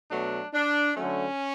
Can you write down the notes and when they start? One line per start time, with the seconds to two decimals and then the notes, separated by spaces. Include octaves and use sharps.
0.11 B2 F#3 A3 D4
0.54 D4
0.95 D3 F#3 A3 C#4